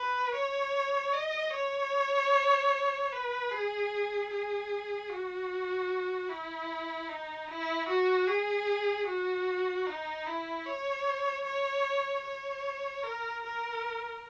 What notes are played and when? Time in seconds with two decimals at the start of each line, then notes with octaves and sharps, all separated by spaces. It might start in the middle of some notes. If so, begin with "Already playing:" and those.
Already playing: B4
0.34 C#5
1.13 D#5
1.53 C#5
3.12 B4
3.51 G#4
4.31 G#4
5.10 F#4
6.29 E4
7.09 D#4
7.48 E4
7.88 F#4
8.28 G#4
9.07 F#4
9.86 D#4
10.26 E4
10.66 C#5
11.44 C#5
12.25 C#5
13.04 A#4
13.43 A#4